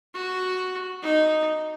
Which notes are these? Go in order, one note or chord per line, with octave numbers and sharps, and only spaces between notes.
F#4
D#4